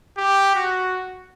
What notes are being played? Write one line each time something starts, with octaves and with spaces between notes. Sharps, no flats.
G4
F#4